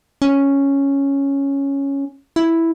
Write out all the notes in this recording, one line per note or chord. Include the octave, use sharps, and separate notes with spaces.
C#4
E4